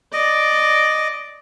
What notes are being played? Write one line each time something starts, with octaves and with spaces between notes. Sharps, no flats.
D5 D#5